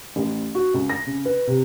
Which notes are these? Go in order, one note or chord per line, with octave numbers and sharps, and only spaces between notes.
A1
F#4
C#2
A#6
C#3
B4
C3